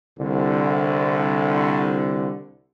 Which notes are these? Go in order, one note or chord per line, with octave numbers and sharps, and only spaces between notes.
C2 D3